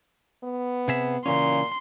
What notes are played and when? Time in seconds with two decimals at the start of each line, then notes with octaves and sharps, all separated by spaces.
0.44 B3
0.88 C3 G#4 E5
1.26 A#2 C#3 E3 C#4 C6